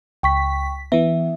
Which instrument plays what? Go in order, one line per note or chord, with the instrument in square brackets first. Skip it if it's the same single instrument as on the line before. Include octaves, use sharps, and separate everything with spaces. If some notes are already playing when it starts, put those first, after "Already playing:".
[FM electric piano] C#2 B6 [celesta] G5 C#6
[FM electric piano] E3 B3 [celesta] E5